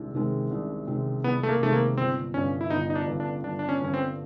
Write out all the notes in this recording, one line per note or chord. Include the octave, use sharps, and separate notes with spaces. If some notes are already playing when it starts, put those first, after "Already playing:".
Already playing: C2 C3 D#3 G#3 C4
C3 D#3 G#3 C4
C2
C3 D#3 G#3 C4
C2 B3
A3
A#3
C3 D#3 G#3 A3 C4
A#3
G1 C4
G2 D3 C#4
E4
G1 D#4
D#4
D4
G2 D3
D4
G1 D4
D4
C#4
G2 D3 C#4
C4